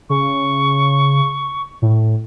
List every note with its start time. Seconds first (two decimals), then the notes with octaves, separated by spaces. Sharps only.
0.10 C#3 C#6
1.82 A2